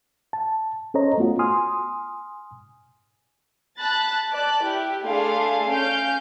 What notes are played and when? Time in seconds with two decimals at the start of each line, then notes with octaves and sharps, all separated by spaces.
0.33 A5
0.94 C#4 A4 C5 C#5 D#5 A#5
1.18 A3 B3 F4 F#4
1.39 G#5 C6 D#6 F6
3.80 A5 B5 F#6 A6
4.31 D5 A5 F#6
4.62 E4 G4
5.05 A3 D4 G#4 A4 F5 C6
5.69 C#4 F5 F6 G6 D7